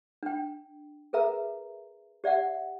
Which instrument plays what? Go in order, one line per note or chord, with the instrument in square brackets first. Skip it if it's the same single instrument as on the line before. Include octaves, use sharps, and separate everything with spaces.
[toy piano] D4 G5
G#4 A#4 B4 E5 A#5
G4 D5 E5 F#5